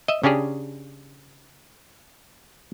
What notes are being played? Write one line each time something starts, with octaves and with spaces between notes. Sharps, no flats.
D#5 E5
C#3 C#4 D4 G4 G#4